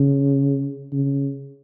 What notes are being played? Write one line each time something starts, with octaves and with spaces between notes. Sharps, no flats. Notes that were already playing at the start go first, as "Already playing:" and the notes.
Already playing: C#3
C#3